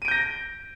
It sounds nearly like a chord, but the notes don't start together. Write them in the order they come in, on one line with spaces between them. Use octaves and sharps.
D#7 D7 G6 A#6